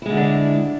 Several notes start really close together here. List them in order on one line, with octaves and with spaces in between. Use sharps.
E4 G#3 D3 E3 D4